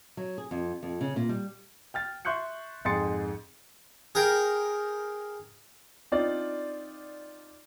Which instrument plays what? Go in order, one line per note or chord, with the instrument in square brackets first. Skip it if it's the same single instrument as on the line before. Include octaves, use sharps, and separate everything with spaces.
[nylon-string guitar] F#3
G#4
F2
F2
C#3
A#2
G3
[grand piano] G5 F6 A6
E5 C6 C#6 F#6 G6 C#7
F2 G#2 G#4 C6 A6 C#7
[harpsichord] G#4 A#4 G5
[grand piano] C4 D4 D#4 F4 D5